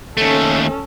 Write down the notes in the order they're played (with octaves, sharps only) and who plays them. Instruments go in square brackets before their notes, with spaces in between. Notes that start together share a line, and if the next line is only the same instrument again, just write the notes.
[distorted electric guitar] D#2 A3 [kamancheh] C#4 A4